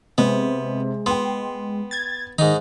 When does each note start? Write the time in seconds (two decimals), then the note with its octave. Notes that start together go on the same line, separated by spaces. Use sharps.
0.18 C3 G#3 B3
1.06 B3 G5 C6
1.91 G#6 A6
2.39 G#2 D#3 D#4